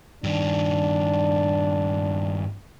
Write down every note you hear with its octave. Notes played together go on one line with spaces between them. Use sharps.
G2 D#3 D4